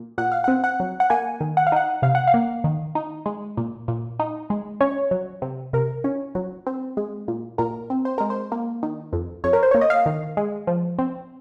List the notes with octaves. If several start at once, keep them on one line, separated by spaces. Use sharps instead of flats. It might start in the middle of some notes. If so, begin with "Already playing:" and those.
Already playing: A#2
A#2 F#5
F5
C4 F#5
F#5
F#3
F#5
A#3 G#5
D#3
F#5
F5
D#4 F#5
C3 F5
F#5
F5
A#3
D#3
D#4
G#3
A#2
A#2
D#4
G#3
C#4 C#5
F#3
C3
C3 A#4
C#4
F#3
C4
G#3
A#2
A#2 A#4
C4
C5
G#3 A#4
C5
A#3
D#3
F2
F2 C#5
A#4
C5
A#3 C#5
D#5
F5
D#3
G#3
F3
C4